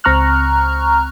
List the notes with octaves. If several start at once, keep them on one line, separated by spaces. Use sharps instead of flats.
C#2 C4 A#5 C#6 F6 F#6